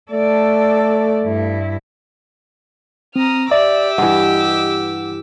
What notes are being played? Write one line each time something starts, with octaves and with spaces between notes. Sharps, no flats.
A3 A4 D5
G2 E4
C4 A#5 D#6 F6
G4 D5 E5 D6 E6
G2 E3 D#5 F#5